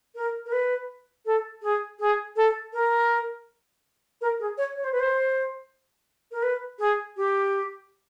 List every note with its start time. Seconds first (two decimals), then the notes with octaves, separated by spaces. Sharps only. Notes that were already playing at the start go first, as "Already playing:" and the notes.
0.15 A#4
0.46 A#4
0.52 B4
1.26 A4
1.62 G#4
1.99 G#4
2.36 A4
2.73 A#4
4.21 A#4
4.40 G#4
4.58 C#5
4.76 C#5
4.84 C5
4.92 B4
5.00 C5
6.32 A#4
6.43 B4
6.79 G#4
7.17 G4